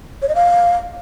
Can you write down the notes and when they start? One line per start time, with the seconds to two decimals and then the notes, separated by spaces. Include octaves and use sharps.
0.22 C#5
0.29 D#5
0.35 F5